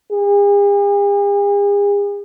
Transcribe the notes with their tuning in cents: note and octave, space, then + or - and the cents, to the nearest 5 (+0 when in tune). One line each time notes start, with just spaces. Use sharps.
G#4 -45